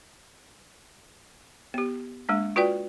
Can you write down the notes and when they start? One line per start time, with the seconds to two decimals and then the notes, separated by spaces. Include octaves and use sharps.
1.74 B3 G4
2.29 G#3 A#3 D4
2.56 F4 F#4 B4 D5 G5